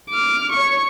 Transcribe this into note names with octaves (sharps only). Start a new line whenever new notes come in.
D6 F6
C#5 C#6